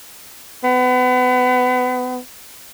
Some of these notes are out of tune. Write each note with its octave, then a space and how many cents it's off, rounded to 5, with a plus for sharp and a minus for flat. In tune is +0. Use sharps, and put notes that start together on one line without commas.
B3 +30